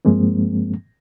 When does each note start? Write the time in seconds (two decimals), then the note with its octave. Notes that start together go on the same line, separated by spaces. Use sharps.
0.05 G2 F3 G#3 A#3 C4